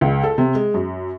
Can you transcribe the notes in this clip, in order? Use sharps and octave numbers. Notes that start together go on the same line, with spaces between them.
C#2
A4
C3
G#3
F#2